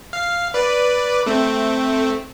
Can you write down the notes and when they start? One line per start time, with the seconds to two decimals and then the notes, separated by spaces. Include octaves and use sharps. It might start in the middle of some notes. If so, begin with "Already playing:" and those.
0.13 F5
0.54 B4 D5
1.26 A3 C4